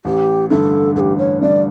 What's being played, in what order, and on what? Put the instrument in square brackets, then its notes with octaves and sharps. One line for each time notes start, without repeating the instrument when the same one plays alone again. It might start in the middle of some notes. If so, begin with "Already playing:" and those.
[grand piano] A1 [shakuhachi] G4
[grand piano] G2 D3 [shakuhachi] A4
[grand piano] A1 [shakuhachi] A4
[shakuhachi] G4
C#5
[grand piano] G2 D3 [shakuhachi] D5